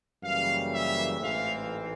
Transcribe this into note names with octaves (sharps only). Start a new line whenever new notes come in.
F#2 C#3 E3 G3 A#3 F5
E5
A1 G#2 E3 A3 C4 F5